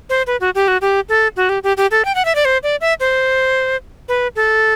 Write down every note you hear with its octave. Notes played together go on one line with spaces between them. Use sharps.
C5
B4
F#4
G4
F#4
G4
A4
F#4
G4
G4
G4
A4
G5
F#5
E5
D5
C5
D5
E5
C5
B4
A4